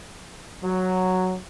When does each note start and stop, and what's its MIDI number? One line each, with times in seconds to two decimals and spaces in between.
0.63 1.35 54